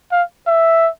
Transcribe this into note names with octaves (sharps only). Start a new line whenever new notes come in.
F5
E5